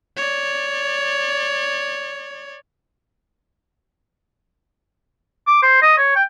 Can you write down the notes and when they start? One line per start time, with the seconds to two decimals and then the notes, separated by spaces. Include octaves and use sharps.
0.16 C#5 D5
5.47 D6
5.62 C5
5.82 D#5
5.98 C#5
6.16 G5